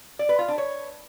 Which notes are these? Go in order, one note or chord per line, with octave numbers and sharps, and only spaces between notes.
D5
B4
F4
D4
C#5